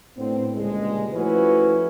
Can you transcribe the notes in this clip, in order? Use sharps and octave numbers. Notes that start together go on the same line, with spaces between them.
A2 D3 B3 C4
C#2 A#2 D3 G3 G#3
F3 A3 C#4 E4 F#4 B4